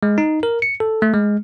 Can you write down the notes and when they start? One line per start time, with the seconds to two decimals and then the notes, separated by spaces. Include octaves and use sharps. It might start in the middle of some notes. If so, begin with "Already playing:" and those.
0.03 G#3
0.18 D#4
0.43 A#4
0.62 C#7
0.80 A4
1.02 A3
1.14 G#3